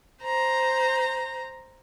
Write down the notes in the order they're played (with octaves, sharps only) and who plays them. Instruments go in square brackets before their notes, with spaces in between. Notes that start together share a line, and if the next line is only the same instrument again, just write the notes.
[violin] C5 A#5